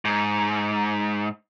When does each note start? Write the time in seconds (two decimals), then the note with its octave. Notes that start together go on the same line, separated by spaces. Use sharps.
0.05 G#2